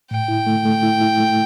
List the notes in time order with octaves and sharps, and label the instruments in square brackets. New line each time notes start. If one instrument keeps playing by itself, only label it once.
[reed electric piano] A2 [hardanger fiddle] G5
[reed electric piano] E4
A3
A3
E4
E4
A3